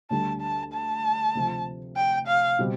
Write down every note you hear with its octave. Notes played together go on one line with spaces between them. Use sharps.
D2 D3 G3 A5
A5
A5
D2 C3 F3
G5
F5
B2 G3 C4